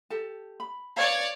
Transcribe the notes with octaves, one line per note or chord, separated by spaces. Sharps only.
G4 A4 A5
B5
B4 C#5 D5 F5